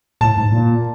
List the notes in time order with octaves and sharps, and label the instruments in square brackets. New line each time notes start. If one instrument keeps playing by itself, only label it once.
[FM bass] A2 [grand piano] A5
[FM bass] G#2
A2
A#2